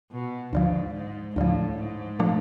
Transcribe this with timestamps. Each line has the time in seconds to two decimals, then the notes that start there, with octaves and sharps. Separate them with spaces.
0.11 B2
0.53 D2 G#2 D3 F3
0.94 G#2
1.36 D2 A2 D3 F3
1.78 G#2
2.19 A#2 F3 A3 D4